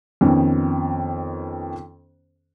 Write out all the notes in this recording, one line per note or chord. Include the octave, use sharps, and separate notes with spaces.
F2 D#3 B3 C#4